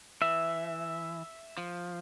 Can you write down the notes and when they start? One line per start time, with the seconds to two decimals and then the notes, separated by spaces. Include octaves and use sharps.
0.22 E3 E5
1.58 F3